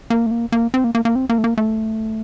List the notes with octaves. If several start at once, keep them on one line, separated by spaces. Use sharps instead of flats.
A#3
A3
A#3
A#3
C4
A#3
A#3
A#3
C4
A#3
A3
A#3
A3